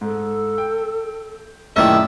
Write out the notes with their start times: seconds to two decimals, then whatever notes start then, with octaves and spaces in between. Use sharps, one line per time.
0.01 G#2 A4
0.58 G5
1.76 F#2 A#2 D#3 A3 E4 G#4 D5 E5